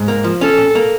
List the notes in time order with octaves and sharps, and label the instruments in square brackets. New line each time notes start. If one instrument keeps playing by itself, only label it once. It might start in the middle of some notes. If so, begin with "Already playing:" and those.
Already playing: [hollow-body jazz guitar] G#2
A#3
F3
[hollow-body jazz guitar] C#4 [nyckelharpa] A4
[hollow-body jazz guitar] A#2
A#3